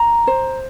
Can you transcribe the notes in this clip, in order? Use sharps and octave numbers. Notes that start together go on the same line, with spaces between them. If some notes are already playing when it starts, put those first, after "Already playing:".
Already playing: A#5
C5